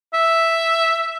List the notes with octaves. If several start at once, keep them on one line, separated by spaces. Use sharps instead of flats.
E5